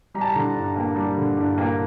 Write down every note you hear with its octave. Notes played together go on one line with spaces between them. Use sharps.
G3 A#5
A5
A#5
D3
G2
A#3
G3
D3
G2
A#3